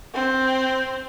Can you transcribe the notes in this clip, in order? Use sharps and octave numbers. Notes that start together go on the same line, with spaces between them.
C4